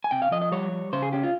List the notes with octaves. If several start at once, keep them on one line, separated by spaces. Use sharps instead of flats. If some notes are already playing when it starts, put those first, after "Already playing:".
G#5
C3 G5
F5
F3 D#5
D#5
G3 C#5
G3
C#3 C5
G#4
C#4 G4
F4